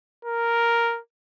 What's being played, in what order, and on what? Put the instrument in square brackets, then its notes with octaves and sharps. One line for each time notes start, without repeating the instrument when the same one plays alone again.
[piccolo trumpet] A#4